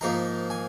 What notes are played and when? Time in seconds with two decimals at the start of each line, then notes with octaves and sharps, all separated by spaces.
0.01 G#2 F3 A#3 D#4 A#5
0.50 G#5